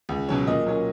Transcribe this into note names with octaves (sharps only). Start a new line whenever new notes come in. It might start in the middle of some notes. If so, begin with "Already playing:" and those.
C#2
B2 F#3 C#4
A#2 D#5
F#3 A#3 C#4